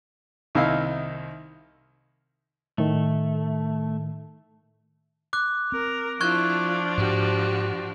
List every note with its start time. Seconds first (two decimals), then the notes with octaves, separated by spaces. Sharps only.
0.55 C2 D#3 D#4 E4 E5 F5
2.78 A2 D#3 A3
5.33 D6 F#6
5.72 C4 A#4
6.21 F3 D4 E4 F4 C#6 F#6 G#6
6.97 G#2 F#4 G4